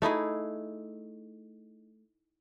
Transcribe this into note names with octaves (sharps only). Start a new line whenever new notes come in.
A3 D#4 E4 G#4